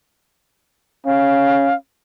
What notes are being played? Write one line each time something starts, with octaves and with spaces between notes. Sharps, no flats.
C#4 F5